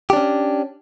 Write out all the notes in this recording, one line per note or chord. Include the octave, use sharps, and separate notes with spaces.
C#4 D4 G4